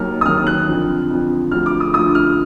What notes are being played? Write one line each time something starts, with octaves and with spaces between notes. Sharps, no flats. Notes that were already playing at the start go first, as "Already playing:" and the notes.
Already playing: D#2 D#3 F#3 F6
D#6
D#2 D#3 F#3 F6
F#6
F2 D3 F3
F2 D3 F3
D2 D3 F3 F6
D6
D#6
D2 D3 F3 D#6
F6